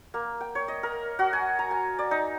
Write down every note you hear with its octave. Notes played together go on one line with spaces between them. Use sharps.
A#3
G5
C#5
D#5
A#4
F#4
G#5
A#5
G#5
D5
D#4